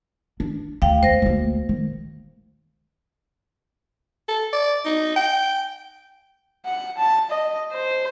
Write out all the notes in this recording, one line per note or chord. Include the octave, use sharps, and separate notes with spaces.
D4
D2 F5 G5
E2 C5 A#6
D2 A#3
D#3
A4
D5
D#4
G5
F#5
A5
D#5
C5